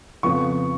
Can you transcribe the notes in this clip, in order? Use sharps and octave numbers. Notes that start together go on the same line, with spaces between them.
F2 C#3 F3 B3 C#6